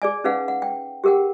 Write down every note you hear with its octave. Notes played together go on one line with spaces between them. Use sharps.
G#4 D5 G#5
C#4 D#4 G#4 B4 F5 F#5
F#5
G5
G4 G#4 A#4 F#5 G5